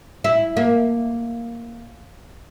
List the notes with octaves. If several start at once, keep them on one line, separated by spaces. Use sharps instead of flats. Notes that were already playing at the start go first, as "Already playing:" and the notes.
E4
A#3